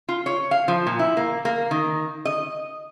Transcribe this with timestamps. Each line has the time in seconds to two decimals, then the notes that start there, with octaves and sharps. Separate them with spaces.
0.09 F4
0.26 C#5
0.51 F5
0.68 F3
0.87 A#2
0.99 E4
1.17 A#3
1.45 A#3
1.71 D#3
2.25 D#5